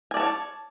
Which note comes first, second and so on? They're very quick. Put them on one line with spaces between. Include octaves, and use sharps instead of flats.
G#5 D5 A5 C#5